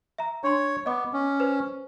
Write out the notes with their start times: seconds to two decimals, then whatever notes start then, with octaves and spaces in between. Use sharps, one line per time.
0.18 E5 A#5
0.44 D4 C#5 C6
0.86 B3 D#5 D6
1.13 C#4
1.40 B4 C5